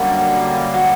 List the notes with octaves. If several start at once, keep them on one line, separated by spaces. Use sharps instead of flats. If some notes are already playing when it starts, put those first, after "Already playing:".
Already playing: F#2 D3 F#3 G3 A#3
F#3